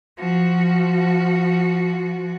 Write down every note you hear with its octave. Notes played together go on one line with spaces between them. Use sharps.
F3 F#4